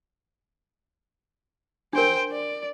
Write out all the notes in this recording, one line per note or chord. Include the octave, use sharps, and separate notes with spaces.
D4 A#4 C5 G5
D5